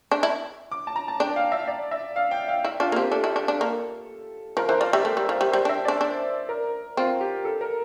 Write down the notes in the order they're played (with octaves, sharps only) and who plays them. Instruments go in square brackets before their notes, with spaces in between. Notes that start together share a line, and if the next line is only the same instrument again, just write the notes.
[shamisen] D4
E4
[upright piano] D6
A5
A#5
A5
[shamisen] D4 [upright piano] G5
[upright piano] F5
E5
D5
E5
F5
G5
F5
[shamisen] E4 [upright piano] E5
[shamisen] D4 [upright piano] F4
[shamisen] A#3
[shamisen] C4 [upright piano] G4
[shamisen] D4 [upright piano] A4
[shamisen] E4
D4
D4
A#3
[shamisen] F3 [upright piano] A#4
[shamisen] E3 [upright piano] C5
[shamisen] F3 [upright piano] D5
[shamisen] G3 [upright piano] E5
[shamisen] A3
G3
F3
G3
[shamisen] G3 [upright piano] C5
[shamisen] D4 [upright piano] E5
[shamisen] D4 [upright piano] D5
[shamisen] D4
[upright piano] A#4
[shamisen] C4 [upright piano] F4
[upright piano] G4
A4
A#4